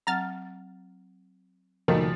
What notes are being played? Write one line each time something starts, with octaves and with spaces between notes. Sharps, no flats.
F#3 C4 F#5 A#5 F6 A6
C#2 A#2 D#3 F3 A3 F#4 D#5